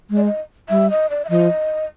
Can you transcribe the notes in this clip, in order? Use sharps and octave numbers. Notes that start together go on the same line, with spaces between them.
G#3
D5
D#5
G3 E5
D#5
D5
E5
F3 D#5